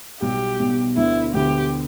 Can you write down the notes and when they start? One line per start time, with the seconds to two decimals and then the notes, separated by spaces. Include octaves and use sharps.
0.21 B1 B2 G3 G4
0.59 B1 B2 G3
0.97 D2 D3 B3 E4
1.34 D2 D3 B3 G4